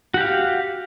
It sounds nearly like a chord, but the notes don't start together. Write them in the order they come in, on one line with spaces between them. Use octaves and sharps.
F#4 G4 F5